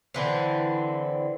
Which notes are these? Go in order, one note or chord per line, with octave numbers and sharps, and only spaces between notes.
D3 E3 C4